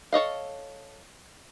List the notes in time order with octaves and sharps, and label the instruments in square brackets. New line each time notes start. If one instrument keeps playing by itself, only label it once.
[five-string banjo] A4 C#5 D#5 F5